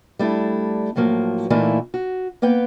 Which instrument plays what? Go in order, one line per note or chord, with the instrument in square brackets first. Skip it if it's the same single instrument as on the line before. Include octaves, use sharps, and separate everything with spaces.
[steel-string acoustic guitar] G3 A3 D4 E4
A2 F3 F#3 A#3
A#2 E3 A3 A#3 D#4 E4
F#4
A#3 B3 B4 G5